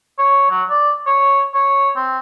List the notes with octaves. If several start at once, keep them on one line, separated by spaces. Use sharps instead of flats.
C#5
F#3
D5
C#5
C#5
C4